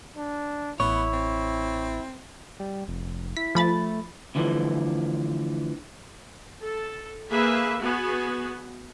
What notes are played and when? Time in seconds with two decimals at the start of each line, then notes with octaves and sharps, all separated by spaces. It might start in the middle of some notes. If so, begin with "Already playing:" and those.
0.17 D4
0.80 A1 B3 E4 C#5
1.13 C4
2.60 G3
2.88 F1
3.37 E4 B6
3.55 F3 A3 B5 A6
4.35 D2 D3 E3 F3
6.62 A4
7.30 A#3 G#4 B4 E5
7.82 B3 F#4 G#4